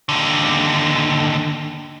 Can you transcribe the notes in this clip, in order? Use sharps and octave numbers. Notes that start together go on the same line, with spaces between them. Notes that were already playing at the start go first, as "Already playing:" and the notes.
D#2 D3